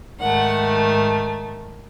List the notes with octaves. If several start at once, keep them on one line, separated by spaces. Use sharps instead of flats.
G#2 D#3 A3 F#5